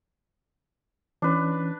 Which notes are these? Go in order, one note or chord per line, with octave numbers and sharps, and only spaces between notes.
E3 C#4 D4 B4